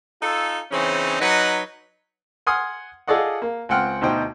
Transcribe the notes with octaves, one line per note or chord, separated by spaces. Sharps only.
D#4 F4 A4
C#3 E3 C4 C#4 D#4
F#3 D#4 B4 D#5 F#5
F#5 G#5 C6 D#6 F6
F4 G#4 A4 D5 D#5 F#5
A#3
C#2 C4 F#5 G5 F6
D2 B2 D#4 C5 G5